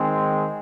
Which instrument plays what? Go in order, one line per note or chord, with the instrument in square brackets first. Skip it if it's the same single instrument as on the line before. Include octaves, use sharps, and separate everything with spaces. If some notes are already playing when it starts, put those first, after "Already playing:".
Already playing: [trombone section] D#3 G#3 C4